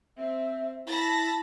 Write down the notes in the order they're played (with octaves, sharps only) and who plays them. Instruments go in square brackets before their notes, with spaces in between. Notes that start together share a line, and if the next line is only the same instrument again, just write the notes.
[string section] C4 [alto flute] E5
[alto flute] E4 [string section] A5 B5 A#6